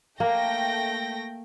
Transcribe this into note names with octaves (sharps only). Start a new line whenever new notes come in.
A3 A#3 G5 A#6